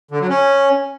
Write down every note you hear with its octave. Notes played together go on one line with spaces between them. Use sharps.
D3
F#3
C#4